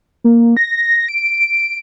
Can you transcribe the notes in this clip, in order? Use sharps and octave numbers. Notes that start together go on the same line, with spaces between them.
A#3
A#6
D7